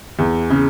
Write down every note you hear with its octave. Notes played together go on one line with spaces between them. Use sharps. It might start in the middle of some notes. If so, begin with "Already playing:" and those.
E2
C#3